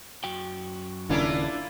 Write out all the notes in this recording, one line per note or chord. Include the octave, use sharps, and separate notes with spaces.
F#2 F#4 G5
D#1 D#2 C#3 A#3 D4 E4 F4